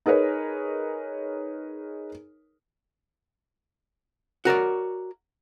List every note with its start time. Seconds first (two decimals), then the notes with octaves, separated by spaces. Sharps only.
0.06 D#4 G#4 A#4 B4 C#5
4.45 F#4 A#4 C#5 D5